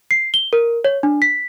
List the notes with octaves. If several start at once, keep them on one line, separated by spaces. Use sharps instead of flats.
C7
G7
A#4
C#5
D4
B6